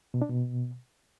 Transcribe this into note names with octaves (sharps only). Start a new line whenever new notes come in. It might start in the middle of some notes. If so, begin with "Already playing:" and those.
B2
D4
B2